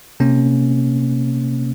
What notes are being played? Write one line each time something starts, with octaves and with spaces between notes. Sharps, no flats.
C3 A#3 C#4